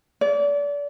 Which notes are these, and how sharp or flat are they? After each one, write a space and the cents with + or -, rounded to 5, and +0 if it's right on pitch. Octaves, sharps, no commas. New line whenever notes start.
D5 -30